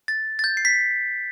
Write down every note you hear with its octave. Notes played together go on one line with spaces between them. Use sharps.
A6
A6
G6
C7
B6